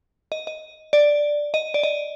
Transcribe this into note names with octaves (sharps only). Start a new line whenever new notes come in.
D#5
D#5
D5
D#5
D5
D#5